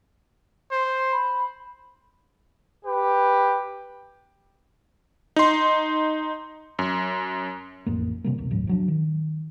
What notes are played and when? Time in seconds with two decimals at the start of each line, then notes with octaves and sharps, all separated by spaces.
0.71 C5
1.12 B5
2.84 G4 B4
5.36 D#4 C6
6.79 F#2
7.86 A1 F2 A#3
8.24 C3 G3 A#3
8.38 E1 B1 C3
8.51 G1 D#2 A2 F#3
8.67 F3 F#3 D4
8.88 D#3